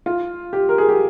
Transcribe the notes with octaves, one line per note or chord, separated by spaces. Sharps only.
F4
G4
A#4
G#4
G4